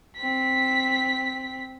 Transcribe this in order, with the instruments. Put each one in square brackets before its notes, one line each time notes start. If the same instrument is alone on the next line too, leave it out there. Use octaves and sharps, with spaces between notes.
[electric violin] C4 B6